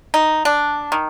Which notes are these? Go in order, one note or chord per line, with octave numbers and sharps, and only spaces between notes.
D#4
D4
D#3